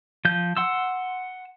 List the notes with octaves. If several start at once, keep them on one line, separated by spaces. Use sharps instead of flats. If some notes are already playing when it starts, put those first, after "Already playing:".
F3 G6
F#5 C6 E6